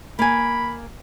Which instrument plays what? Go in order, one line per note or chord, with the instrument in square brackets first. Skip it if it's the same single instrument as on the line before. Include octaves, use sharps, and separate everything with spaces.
[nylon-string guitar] A#3 G#5 [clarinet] B5